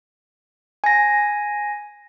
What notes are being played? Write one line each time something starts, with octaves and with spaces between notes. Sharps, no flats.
G#5 A#6